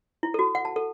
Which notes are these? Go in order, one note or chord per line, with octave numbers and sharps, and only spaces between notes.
E4
A4
F#4
F#5
A5
A4